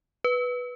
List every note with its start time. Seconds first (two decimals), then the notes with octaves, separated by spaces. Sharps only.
0.24 B4